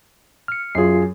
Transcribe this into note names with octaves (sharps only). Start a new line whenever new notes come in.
F6 C#7
F#2 F4 G#4 C7